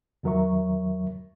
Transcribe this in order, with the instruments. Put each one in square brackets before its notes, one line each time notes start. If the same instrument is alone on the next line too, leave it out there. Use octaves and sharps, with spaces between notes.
[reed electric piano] E2 D#3 F#3 A#4 E5 C#6